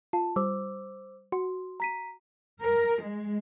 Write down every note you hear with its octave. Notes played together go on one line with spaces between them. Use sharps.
F4 A5
G3 C5 D6 E6
F#4 C6
A#5 B6 D#7
A#4
G#3